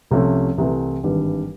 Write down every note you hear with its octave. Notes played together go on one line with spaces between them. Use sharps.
C2 C3 F3 A3 C#4
C2 C3 E3 A3
G#1 G2 E3 G3